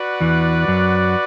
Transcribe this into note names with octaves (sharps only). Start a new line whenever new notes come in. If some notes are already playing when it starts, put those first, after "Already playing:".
Already playing: F#4 B4 D5 F#5
E2 E3
F#2 F#3